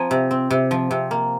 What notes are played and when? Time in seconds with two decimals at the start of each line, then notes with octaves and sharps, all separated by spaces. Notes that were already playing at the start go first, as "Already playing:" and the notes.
Already playing: F3 C4 G#5 A#5
0.11 C3
0.31 C4
0.50 C3
0.71 F3
0.91 C3
1.11 A#3